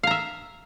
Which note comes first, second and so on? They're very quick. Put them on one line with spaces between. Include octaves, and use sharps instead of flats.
F5 A#5 E5